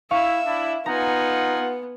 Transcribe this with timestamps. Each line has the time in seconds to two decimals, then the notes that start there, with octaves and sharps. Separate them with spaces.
0.11 E4 E5 F5 C#6
0.45 D4 E4
0.86 B3 D#4 F4 F#5 G#5 A#5
1.60 B3